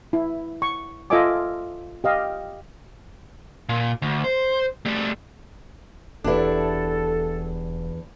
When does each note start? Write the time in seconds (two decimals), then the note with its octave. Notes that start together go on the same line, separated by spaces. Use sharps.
0.13 E4
0.62 C#6
1.10 F4 A4 D#5 E5 G#5 D6
2.04 G4 D#5 F5
3.69 A#2
4.02 D2
4.24 C5
4.86 G3 A3
6.24 E1 E2 D4 E4 G4 A4 B4